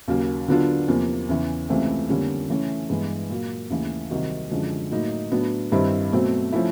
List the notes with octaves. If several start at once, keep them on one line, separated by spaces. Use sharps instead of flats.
D#2 C#3 F#3 A#3
D3 F#3 B3 D4 F4
E2 C3 F3 A#3
E2 C#3 E3
C#2 C3 E3 A3 C4
F2 D3 G3 A#3 C#4
C#3 E3 A3 C#4 E4
G2 E3 G#3 B3
A#2 F#3 A#3
D#2 C#3 E3 A3
C2 C3 D#3 F#3
F#2 D3 F3 G#3
A2 F#3 A#3 D#4
A2 F#3 B3 D4
G2 D#3 G3 C4 E4
B2 F#3 A3 C4
F3 A3 C#4 E4